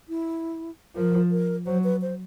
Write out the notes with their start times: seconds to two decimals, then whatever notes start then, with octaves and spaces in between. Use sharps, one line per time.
0.09 E4
0.96 F3 A#4
1.31 A#4
1.66 F#3 C5
1.84 B4
2.02 C5